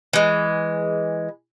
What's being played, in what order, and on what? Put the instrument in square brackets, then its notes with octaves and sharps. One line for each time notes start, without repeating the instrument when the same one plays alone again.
[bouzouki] E3 G#3